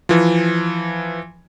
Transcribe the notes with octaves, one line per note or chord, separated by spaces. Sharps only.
E3 F3